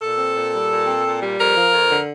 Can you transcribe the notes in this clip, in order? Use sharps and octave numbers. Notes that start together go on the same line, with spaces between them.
A#2 A4
C4
A#2
G3
A#2
C4
A#2
G3
F2 A#4
F3
F2
D3